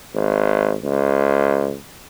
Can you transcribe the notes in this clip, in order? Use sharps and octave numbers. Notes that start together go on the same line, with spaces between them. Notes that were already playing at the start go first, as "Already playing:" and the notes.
G#1
C#2